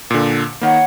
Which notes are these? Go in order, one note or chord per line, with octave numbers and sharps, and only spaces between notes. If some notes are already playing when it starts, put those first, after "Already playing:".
A#2 D3
D#3 A#3 C#5 F#5 B5